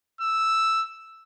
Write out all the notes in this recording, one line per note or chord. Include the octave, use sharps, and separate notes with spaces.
E6